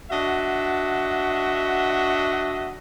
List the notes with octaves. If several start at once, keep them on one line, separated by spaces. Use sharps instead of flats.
D4 F#4 D#5 E5 F#5